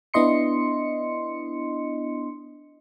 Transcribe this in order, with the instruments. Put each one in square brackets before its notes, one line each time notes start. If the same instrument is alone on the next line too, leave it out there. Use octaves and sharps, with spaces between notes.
[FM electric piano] B3 D4 E4 D#5 C6 C#7